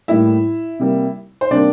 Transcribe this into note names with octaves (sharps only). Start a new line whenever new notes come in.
A2 G3 A#3 E4 E5
C3 G3 A#3
C5
C3 G3 A#3 D4 D5